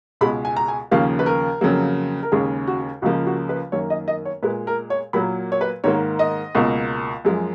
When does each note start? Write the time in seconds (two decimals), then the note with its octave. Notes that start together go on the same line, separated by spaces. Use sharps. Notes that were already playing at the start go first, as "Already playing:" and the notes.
0.21 C#2 B2 G#3 B5
0.45 G#5
0.57 A#5
0.68 G#5
0.91 D#2 C#3 F3 A#3 F5
1.19 B4
1.26 A#4
1.61 F2 C#3 F#3 A#3
2.23 A#4
2.32 D#2 C#3 G#3 G#4
2.67 F#4
3.02 C#2 C#3 F3 A#3 F#4
3.26 F#4
3.49 B4
3.72 F#2 D#3 A#3 C#5
3.90 D#5
4.08 D#5
4.25 C#5
4.43 A#2 G#3 B4
4.67 A#4
4.90 C#5
5.13 A#2 F#3 A#3 B5
5.52 C#5
5.61 B4
5.84 G#2 D#3 A#3 C#5
6.19 D#5
6.55 C#2 B2 A#3
7.25 F#2 F3 G#3